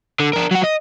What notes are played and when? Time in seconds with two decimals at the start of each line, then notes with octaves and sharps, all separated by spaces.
0.20 D3
0.33 D4 A#4
0.51 F#3 F#5
0.64 D#5